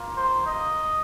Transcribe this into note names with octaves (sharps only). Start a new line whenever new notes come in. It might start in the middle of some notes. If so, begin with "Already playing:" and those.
Already playing: A#3 F4
C5
D#5